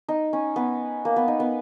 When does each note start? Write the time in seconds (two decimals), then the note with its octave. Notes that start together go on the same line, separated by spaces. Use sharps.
0.08 D#4
0.33 C#4
0.56 B3
1.05 A#3
1.16 B3
1.28 D#4
1.40 B3